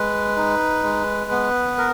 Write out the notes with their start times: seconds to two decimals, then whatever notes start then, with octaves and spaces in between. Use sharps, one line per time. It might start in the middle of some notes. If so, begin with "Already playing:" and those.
Already playing: G#3 B4
0.37 D#4
0.83 G#3
1.31 B3
1.78 A#4